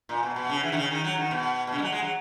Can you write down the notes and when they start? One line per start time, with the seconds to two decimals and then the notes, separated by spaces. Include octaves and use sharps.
0.09 A#2
0.23 B2
0.36 B2
0.49 C#3
0.63 E3
0.72 D#3
0.77 C#3
0.90 D#3
1.04 F#3
1.18 D#3
1.31 B2
1.67 B2
1.72 C#3
1.78 G#3
1.82 F#3
1.92 G#3
2.02 F#3